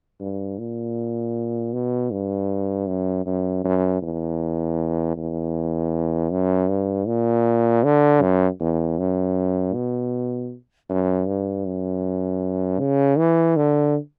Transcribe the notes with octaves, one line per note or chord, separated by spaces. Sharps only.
G2
A#2
B2
G2
F#2
F#2
F#2
E2
E2
F#2
G2
A#2
D3
F#2
E2
F#2
B2
F#2
G2
F#2
C#3
E3
D3